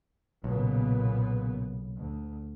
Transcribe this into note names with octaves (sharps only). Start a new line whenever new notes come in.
B1 A#2 C#3 B3
D2